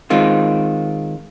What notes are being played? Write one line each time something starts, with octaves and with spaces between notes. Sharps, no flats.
D#3 G#3 C4 F4